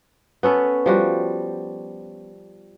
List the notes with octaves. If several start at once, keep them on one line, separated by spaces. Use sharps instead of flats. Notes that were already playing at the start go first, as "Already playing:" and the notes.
B3 C#4 A4 B4
F3 G3 F#4